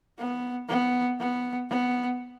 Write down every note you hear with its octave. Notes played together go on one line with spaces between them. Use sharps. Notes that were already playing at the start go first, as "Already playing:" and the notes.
B3
B3
B3
B3